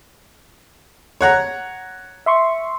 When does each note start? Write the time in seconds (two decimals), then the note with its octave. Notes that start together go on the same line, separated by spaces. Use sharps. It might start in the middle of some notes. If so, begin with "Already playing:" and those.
1.21 C#5 F#5 A#5
2.26 E5 C6 C#6